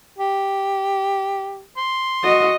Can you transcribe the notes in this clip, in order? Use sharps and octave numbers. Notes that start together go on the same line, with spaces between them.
G4
C6
F#4 D#5